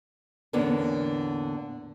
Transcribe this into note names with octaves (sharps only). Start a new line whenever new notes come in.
E2 A2 D3 A#3 B3 C#4